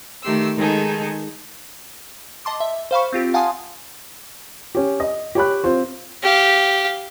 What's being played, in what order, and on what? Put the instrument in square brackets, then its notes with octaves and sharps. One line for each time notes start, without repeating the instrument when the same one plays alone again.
[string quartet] D#3 A3 G4 C6 E6
D#3 G#3 D#4 G#4 A4
[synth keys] D#5 A5 C6 D6
E5
C5 F5 B5 C#6
C4 F4 G4
F5 F#5 G#5 A5 C6 D#6
[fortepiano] C#4 G4
D#5
G4 C#5 B5 F#6
C4 F4 C5
[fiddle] G4 F5